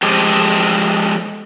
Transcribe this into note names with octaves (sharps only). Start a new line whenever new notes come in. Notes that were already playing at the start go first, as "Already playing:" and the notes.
F3 G#3 G4 A4 C5 D#5